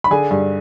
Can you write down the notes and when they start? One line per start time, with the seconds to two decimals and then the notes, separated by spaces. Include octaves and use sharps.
0.04 B5
0.11 D3 G#4 G#5
0.31 G2